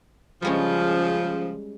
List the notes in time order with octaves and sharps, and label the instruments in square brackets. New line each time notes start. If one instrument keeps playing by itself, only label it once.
[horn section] C#3 F3 [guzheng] G3 G#3 C#4